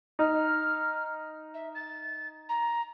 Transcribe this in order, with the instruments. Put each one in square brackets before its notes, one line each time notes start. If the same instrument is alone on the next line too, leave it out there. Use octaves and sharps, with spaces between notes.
[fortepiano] D#4 [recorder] F6
[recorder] E5
A6
A#5